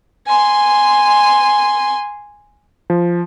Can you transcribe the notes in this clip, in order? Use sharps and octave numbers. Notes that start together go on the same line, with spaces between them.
G#5 C6
F3